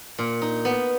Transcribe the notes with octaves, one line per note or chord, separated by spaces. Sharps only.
A#2
D#4
B3